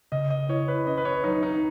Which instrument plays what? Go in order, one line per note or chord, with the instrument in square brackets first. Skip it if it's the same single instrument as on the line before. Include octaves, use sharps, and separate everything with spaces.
[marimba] C#3 [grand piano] D#5
[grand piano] D#5
[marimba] E4 [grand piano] C#5
[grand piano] B4
[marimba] C#4 [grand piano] D#5
[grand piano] B4
C#5
[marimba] F#3 [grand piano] D#4
[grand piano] D#4